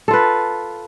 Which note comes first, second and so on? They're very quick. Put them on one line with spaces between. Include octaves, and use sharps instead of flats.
A4 F4 B4